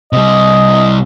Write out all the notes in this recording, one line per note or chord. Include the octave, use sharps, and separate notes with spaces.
C3 G3 D#5